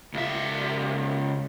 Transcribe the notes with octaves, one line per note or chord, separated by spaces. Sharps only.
C#2 E5